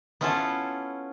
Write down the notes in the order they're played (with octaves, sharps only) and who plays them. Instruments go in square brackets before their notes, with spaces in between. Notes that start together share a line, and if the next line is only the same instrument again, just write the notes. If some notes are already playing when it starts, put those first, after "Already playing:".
[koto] B3 C#4 E4 F4 A4